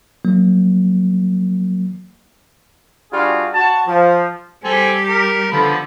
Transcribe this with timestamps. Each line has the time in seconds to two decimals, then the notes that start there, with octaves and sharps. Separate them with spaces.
0.25 F#3 A#3
3.12 G3 D4 F4 F#4 G#4
3.54 F#4 A5
3.87 F3
4.64 G3 C4 G4 A4 G#5
5.08 A#4
5.52 D3 F3 B3 B5